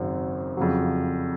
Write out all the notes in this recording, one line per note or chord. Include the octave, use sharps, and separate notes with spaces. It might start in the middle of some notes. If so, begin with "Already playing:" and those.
Already playing: G#1 F#2 C#3 F#3 C4
F2 C#3 F#3